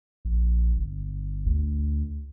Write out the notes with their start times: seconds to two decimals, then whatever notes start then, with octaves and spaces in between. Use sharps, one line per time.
0.25 A#1
0.77 G1
1.46 D2